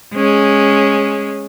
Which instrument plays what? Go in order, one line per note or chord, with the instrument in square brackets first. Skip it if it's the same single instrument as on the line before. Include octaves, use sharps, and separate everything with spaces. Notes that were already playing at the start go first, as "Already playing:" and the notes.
[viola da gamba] G#3 C#4